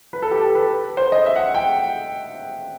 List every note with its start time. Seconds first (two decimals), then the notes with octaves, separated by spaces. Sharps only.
0.13 B4
0.22 A4
0.31 G4
0.41 A4
0.55 B4
0.97 C5
1.12 D#5
1.26 E5
1.36 F#5
1.54 G5